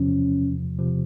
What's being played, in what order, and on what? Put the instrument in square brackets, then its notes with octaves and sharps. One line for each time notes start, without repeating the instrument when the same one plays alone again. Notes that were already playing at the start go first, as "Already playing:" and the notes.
Already playing: [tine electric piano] E2 C3 F3 [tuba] C#4
[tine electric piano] C3 F3